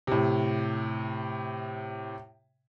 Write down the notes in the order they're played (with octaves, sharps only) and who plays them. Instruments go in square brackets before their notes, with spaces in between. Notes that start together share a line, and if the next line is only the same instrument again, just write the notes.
[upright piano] A2 C3